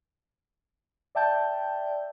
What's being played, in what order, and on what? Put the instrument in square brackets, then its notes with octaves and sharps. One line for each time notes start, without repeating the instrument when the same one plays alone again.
[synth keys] D5 E5 G5 A5 G6